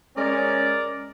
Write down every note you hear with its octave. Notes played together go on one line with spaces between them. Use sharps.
G#3 C#4 A#4 D5